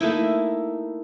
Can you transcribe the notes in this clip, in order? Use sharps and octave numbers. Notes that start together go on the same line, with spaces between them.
A3 A#3 D#4 E4